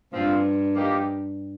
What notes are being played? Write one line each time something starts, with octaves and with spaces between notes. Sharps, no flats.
G2 F3 C4 F4
F3 A#3 D#4 G4